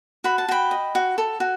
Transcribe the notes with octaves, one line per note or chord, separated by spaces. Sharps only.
F#4 B5
A5
F#4 G5 B5
D#5
F#4
A4
F#4